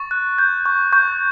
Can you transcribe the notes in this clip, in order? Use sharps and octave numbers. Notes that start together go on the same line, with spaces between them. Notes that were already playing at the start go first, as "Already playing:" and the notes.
Already playing: C#6 A6
F#6
G6
C#6
C#6 G6